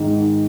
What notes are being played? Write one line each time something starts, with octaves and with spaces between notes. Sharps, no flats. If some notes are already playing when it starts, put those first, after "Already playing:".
Already playing: G#2 D#3